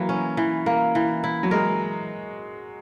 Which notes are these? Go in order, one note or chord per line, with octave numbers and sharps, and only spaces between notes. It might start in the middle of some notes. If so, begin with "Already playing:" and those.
Already playing: E3 F#3 A#3
C#4
E3
A#3
E3
E4
F#3
G#3 A#4